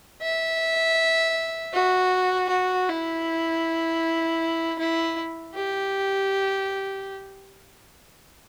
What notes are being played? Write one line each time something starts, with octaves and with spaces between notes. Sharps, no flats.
E5
F#4
F#4
E4
E4
G4